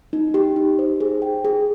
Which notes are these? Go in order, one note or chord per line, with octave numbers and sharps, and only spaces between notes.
D#4
G4
D#4
C5
G#4
G5
G#4